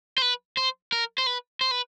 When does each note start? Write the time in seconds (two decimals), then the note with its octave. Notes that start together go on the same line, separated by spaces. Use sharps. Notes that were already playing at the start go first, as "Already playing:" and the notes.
0.18 C5
0.22 B4
0.57 C5
0.92 A#4
1.18 C5
1.26 B4
1.61 C5
1.71 B4